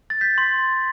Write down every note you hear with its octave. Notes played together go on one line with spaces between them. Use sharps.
A6
G6 B6
C6